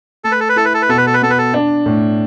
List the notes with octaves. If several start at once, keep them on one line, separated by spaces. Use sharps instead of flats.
A3 A4
B4
A4
B4
E4 A4
B4
A4
B4
B2 A4
B4
A4
B4
B3 A4
B4
A4
D4
A2